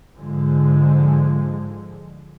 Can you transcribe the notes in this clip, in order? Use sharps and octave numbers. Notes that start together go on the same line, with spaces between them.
G#2 D3 F3 G#3